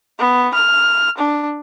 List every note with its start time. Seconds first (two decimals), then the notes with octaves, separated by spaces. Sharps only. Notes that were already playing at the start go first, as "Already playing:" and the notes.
0.19 B3
0.54 F6
1.18 D4